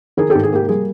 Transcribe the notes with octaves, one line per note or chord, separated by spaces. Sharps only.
D#3 G#4 A#4
G#2 G4 A4
G#4
A#3 G4
G3 G#4